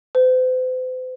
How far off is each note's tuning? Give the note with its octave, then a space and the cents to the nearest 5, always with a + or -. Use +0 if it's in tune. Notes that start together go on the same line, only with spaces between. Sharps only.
C5 -40